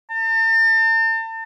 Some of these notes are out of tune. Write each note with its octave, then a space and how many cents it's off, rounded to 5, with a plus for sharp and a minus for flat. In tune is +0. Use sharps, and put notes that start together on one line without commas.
A5 +40